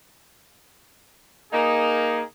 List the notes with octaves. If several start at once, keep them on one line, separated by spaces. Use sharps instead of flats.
A#3 D#4 G#4